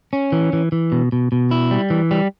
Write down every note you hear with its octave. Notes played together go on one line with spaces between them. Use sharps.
C#4
E3
E3
E3
B2
B2
B2
E4
G3
E3
G3